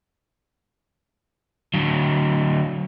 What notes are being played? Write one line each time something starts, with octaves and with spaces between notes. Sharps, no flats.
D3 F#3